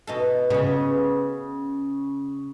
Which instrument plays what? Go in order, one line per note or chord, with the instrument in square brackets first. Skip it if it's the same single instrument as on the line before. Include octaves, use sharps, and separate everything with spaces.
[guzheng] B2 D#4 A4
[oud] C#3 [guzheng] B3 C#4